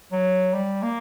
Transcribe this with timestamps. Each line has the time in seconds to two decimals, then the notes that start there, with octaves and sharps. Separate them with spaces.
0.12 F#3
0.53 G3
0.82 A#3